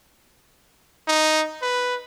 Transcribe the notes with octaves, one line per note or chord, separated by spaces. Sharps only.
D#4
B4